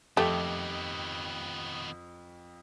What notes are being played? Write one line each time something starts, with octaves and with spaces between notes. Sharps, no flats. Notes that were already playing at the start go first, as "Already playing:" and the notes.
F2 D#3 A3 B3 G4